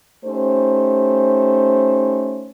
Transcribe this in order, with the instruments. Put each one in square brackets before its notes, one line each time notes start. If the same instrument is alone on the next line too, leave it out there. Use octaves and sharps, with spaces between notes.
[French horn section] A3 C#4 D#4 G4 C5